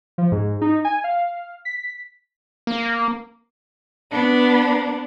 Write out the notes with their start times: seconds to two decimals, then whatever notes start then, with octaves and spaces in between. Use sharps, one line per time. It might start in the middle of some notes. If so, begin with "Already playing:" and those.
0.18 F3
0.32 G#2
0.61 D#4
0.85 G#5
1.04 F5
1.65 B6
2.67 A#3
4.11 B3 D4